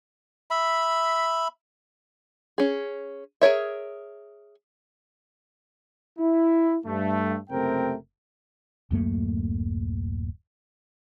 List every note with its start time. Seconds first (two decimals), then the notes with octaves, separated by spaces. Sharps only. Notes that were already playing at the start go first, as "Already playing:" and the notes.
0.51 E5 B5
2.58 C#4 G#4
3.41 G#4 A#4 C#5 E5
6.19 E4
6.85 G2 A3
7.50 F#1 C3 A3 C4 A#4 G5
8.91 D1 F#2 A3 A#3